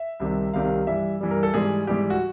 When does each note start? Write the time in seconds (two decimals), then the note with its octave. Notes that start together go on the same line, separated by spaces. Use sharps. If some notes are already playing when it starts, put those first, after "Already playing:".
Already playing: E5
0.20 C2 C3 D#3 G3
0.53 C2 C3 D#3 G3 F5
0.87 G2 E3 G3 E5
1.21 G2 E3 G3
1.31 A#4
1.43 A4
1.54 G#2 E3 G3 G#4
1.87 G#2 E3 G3 G4
2.10 F#4